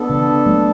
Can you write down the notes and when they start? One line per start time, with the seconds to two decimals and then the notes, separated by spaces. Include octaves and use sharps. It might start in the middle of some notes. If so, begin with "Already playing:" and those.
Already playing: B3 D4 A4
0.09 C#3 E3
0.46 F#3 A3